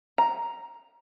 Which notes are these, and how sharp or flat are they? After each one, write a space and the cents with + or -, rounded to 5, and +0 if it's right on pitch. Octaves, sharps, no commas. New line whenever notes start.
A#5 +5